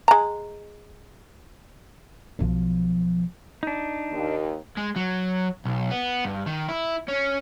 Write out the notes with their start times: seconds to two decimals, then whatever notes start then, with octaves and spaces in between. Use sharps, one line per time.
0.08 G#3 A#5
2.39 B1 F3
3.63 D4 D#4
4.11 D#2
4.77 G#3
4.96 F#3
5.65 B1
5.91 B3
6.25 G2
6.46 D#3
6.69 E4
7.09 C#4